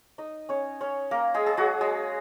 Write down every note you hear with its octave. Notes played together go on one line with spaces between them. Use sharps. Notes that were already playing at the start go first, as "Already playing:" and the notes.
D#4 D#5
C#4 C#5
C#4 C#5
A#3 A#4
G#3 G#4
G#4
F#3 F#4
G#3 G#4